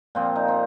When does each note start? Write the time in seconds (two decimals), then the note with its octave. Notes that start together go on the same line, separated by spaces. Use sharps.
0.15 A#2 F3 C4
0.35 D#4
0.48 C4